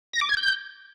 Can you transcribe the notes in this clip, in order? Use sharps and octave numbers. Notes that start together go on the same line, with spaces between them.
A#6
D6
G#6
G6